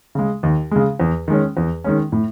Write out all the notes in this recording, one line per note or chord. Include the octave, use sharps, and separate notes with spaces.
C#3 G#3
D#2
C#3 G#3
E2
D#3 G#3 C#4
E2
D#3 G#3 C#4
A2